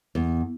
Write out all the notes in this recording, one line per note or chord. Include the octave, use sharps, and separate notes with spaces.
E2